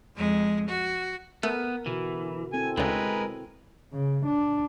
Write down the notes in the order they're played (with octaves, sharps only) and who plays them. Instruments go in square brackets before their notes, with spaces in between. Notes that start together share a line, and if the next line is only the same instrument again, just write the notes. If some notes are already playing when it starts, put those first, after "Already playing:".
[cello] F2 G#3
F#4
[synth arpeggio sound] A3 [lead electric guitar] B3 [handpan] A#4
[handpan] B2 D3 F#4 [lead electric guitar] E3
[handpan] C4 E4 A4 [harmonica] G#5
[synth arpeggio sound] D2 C#3 [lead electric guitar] G#3 [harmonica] A#4 B4 G#5
[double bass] C#3
D4